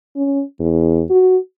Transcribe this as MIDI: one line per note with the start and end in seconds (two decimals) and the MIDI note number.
0.16 0.43 61
0.60 1.03 40
1.10 1.37 66